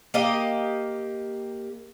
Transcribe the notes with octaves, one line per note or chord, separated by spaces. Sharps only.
A#3 G4 D#5